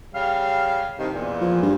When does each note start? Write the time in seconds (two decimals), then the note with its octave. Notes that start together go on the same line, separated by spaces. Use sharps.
0.13 C#3 G3 F5
0.98 G2 C3 D#3
1.13 E2 A#2
1.41 F3
1.62 G2